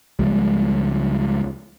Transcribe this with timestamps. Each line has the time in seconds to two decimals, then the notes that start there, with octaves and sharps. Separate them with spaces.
0.19 C#2 F3 G3 G#3